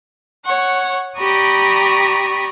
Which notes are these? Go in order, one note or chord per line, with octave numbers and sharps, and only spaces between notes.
C#5 F#5 C#6
G4 D5 A#5 B5 C#6 D#6